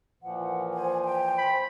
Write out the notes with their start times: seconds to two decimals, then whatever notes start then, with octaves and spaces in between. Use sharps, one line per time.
0.23 A#2 E3 F3 F#5
0.74 C5 G#5
1.05 G5
1.38 B5